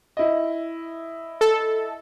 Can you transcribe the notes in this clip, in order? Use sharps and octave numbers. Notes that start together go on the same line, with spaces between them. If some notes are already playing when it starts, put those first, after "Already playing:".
E4 D#5
A4